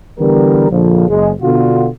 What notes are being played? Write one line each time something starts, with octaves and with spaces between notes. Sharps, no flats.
D3 E3 G3 B3 A#4
A#1 D3 F3
F#1 G#3
B2 D3 F4 F#4